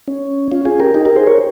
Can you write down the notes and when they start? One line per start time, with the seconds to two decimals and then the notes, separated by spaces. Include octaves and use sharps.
0.08 C#4
0.51 C#4 F4
0.65 F4 G#4
0.80 G4 A#4
0.94 D#4 G4
1.05 G4 A#4
1.16 G#4 C5
1.27 A#4 C#5